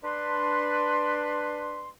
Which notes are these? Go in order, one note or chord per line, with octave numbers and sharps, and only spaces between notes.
D4 B4 C6